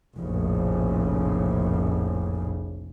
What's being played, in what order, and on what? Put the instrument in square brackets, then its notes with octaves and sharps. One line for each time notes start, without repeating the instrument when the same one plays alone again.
[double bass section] F1 A#1 F2 A2 C#3